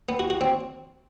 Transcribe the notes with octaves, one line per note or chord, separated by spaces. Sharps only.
B3
F#4
F#4
C4